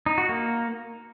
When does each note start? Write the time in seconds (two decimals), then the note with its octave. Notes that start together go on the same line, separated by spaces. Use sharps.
0.06 D#4
0.18 F#4
0.29 A#3